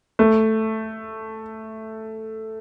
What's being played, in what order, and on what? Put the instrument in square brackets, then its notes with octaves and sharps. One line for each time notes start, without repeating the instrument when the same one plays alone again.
[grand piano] A3